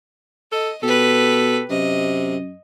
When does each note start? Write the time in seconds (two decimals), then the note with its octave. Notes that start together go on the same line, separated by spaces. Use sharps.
0.52 A4 D#5
0.83 B2 G4 A4 B4
1.70 F#2 C3 D#5